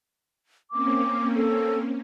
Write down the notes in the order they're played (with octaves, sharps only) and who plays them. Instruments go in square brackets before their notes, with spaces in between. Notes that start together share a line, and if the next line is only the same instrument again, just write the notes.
[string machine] A#3 C4 C#4 [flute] D6
[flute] A4